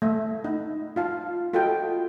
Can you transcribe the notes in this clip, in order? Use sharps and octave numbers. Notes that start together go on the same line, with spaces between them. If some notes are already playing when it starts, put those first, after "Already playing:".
A3 E5
D#4
F4 F5 A5
F4 F#4 A4 D#5 F#5 G5